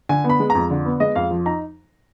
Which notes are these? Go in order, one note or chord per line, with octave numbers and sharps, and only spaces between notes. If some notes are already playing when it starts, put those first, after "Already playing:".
D3 G#5
B3
B5
G#3
F2 A#5
D3
B3
G#3 D#5
F2 F5
F3
D#4 A#5